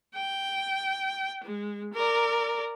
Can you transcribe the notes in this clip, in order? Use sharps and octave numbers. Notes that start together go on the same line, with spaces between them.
G5
G#3
A#4 D5